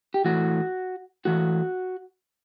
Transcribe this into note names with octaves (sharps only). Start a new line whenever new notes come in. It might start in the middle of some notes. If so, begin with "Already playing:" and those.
G4
A2 E3 F#4
A2 E3 F#4